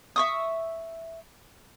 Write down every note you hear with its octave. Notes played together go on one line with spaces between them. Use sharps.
E5 C#6 D#6